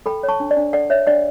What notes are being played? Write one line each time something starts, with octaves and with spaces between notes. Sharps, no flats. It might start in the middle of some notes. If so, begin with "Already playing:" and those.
A4 G5 B5
C#5
A5 C#6
D4
D5
D4
A4 D5 F#5
C#5 E5
D4 D5 F#5